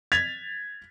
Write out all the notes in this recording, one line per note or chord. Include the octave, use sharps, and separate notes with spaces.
G#6 A6 B6 F7